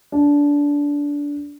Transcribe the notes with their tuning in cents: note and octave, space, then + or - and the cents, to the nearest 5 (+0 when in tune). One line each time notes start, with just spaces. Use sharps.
D4 -20